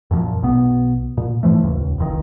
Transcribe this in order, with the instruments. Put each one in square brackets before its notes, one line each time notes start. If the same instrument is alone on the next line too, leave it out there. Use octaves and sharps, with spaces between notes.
[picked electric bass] F#2 A#2 E3 F3
B1 B2 B3
A#2
G#2 E3 F3 A3
D#1 C#2
F#1 C#2 D#3